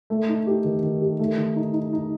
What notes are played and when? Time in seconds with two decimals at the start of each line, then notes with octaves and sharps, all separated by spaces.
0.10 A3
0.29 D#4
0.47 G4
0.64 D#3
0.83 D#3
1.01 G4
1.19 A3
1.37 D#3
1.56 D#4
1.73 D#4
1.93 D#4